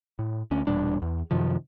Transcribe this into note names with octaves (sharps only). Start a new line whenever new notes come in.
A2
D2 C#4
E1 A#2 G3 D4
E2
F#2 C3 D#3 F3